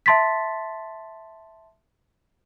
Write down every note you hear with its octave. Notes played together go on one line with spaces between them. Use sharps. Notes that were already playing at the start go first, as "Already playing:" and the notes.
E5 A5 C6 A6 B6